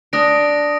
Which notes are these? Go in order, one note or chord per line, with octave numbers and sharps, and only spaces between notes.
D4 D#6 A#6 D7